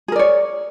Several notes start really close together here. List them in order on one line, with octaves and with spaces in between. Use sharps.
G#4 A#4 D5 C#5